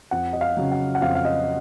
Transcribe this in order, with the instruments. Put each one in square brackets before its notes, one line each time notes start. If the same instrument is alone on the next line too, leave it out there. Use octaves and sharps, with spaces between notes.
[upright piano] F2 F#5
D#5
F5
C#3 F#3
F#5
F#5
F2 F5
F5
D#5